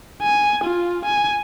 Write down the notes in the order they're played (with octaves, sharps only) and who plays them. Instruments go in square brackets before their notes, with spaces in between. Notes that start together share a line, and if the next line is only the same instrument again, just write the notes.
[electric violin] G#5
F4
G#5